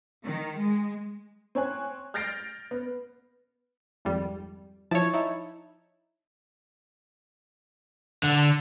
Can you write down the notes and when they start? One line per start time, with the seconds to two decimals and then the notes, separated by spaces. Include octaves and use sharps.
0.24 D#3
0.57 G#3
1.55 C4 C#5 G#5 F#6
2.14 F6 G6 A6 A#6 C7 D7
2.71 B3
4.05 G#1 F2 G3
4.91 F3 E4 C#5 A5
5.14 D#4 E4 E5
8.23 D3